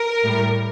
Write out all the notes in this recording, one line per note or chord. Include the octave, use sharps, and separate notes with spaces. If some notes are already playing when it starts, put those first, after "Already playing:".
Already playing: A#4
A2 G3